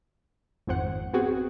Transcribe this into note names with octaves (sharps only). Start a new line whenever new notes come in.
G#1 F2 C5 F#5
B3 C4 F#4 G#4